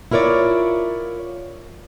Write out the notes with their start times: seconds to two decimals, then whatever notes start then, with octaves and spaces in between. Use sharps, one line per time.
0.11 E4 F4 A#4 C#5 D5